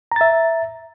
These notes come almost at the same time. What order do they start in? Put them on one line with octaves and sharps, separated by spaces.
A#5 A6 E5